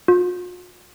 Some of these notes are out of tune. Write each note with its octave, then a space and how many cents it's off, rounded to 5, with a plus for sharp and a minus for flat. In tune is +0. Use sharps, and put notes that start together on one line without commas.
F4 +40